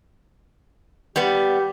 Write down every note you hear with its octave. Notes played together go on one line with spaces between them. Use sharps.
G3 B3 G4